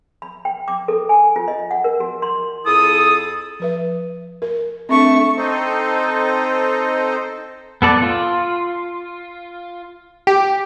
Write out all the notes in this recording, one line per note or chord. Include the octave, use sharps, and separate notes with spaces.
B5
G5
D6
A4
G#5
F4
D#5
F#5
A#4
F#4
C6
F2 E4 G#4 A4 D#6
F3 B4 E5
A#4
A3 C4 D4 C#6
C4 D#4 A4 C5 D#5
B3 A4 D5
F4
G4